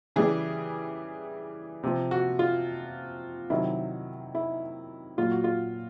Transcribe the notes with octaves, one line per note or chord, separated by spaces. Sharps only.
C#3 E3 G3 G#4
C3 F3
F#4
F4
C3 D#3 F#3 E4
E4
A#2 F#3 F4
F#4
F4